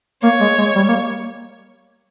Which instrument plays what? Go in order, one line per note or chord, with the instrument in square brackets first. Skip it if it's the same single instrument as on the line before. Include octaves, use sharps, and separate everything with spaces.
[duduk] A#3 [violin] C#5
[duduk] G#3
G#3
G3
A#3